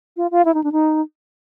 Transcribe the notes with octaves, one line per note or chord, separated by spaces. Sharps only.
F4
F4
E4
D#4
D4
D#4